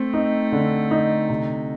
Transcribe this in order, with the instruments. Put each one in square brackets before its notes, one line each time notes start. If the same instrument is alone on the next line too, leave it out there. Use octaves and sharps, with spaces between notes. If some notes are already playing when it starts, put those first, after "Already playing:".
Already playing: [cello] A3 [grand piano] C4
[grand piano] D#4
D3
D#4
C3